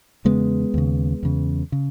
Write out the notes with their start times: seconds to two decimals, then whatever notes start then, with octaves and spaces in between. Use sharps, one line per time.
0.25 E2 C#3 G#3 B3
0.74 D#2 C#3
1.23 E2 C#3
1.72 C#3